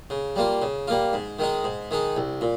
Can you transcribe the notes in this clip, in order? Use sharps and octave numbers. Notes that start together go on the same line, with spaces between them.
C#3
G3 A#3 F4
C#3
G3 A#3 F4
G#2
D#3 G#3 D#4
G#2
D#3 G#3 D#4
C2
A#2